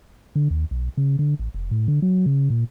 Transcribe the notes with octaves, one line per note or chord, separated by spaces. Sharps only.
D3
D#2
B1
C#3
D3
A1
F1
A2
D3
F#3
C#3
A#2